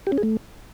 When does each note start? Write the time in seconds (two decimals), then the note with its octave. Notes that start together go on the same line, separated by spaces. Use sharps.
0.07 G4
0.12 C#4
0.18 G#4
0.23 A3